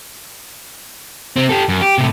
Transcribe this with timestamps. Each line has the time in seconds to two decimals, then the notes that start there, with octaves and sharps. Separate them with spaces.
1.36 C3 C4
1.49 G4 A4
1.69 F#2
1.81 G4
1.98 A2 C3